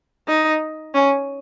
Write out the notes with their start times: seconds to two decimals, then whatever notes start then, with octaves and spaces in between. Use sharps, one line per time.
0.28 D#4
0.94 C#4